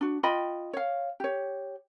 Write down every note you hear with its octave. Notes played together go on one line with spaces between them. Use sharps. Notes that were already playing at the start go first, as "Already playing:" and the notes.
D4 F#4
F4 D#5 G5 B5
C#5 F5
G4 C#5